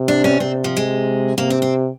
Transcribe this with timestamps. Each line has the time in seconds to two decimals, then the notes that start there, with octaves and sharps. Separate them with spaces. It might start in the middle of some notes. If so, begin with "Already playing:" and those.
Already playing: C3
0.08 D4
0.24 C#4
0.40 C3 C4
0.64 F3
0.77 G#3
1.38 C3 A#3
1.50 C4
1.62 C4